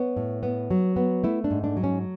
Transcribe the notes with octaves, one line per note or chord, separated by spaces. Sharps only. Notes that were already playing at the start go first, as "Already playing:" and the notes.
Already playing: B3 C#5
A2
B3
F#3
B3
A3 E4
D4
G#2
D4
F#3
C#4